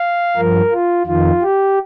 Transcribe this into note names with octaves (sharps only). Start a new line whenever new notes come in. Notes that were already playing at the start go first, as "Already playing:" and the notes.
Already playing: F5
G2 F3 A#4
F4
F2 D#3 F4
G4